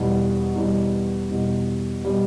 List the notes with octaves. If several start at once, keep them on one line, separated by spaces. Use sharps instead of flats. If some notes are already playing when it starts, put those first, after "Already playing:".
Already playing: E2 B2 G3
E2 B2 G3
E2 B2 G3
B2 G3